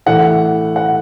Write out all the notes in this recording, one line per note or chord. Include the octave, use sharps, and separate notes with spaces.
A2 E3 A3 F#5
F#5